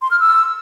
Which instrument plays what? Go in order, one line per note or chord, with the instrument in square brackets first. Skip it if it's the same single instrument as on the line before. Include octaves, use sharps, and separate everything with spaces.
[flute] C6
F6
E6